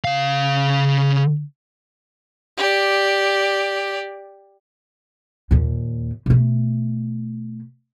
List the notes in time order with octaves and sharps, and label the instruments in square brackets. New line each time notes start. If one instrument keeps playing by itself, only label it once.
[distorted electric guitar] C#3 F5
[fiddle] G4 D5
[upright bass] D#2 A#2
B2 A3